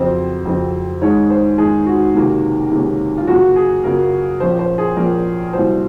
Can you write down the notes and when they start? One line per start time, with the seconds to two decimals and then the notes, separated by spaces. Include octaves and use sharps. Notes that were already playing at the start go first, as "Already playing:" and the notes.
Already playing: F2 C#3 F#3 C4 C5
0.45 F2 C#3 F#3 C4
1.02 G#2 D#3 G#3 C#5
1.30 C5
1.58 G#2 D#3 G#3 G#4
1.86 F#4
2.15 C#2 C3 D#3 A#3 C#4
2.71 C#2 C3 D#3 A#3 C#4
3.18 F4
3.27 F#2 C#3 F#3 A#3 F#4
3.56 G#4
3.83 F#2 C#3 F#3 A#3 A#4
4.40 A#1 A#2 F3 A#3 C#4 C5
4.59 C5
4.78 G#4
4.97 A#1 A#2 F3 A#3 C#4 A#4
5.53 C2 A#2 F#3 C5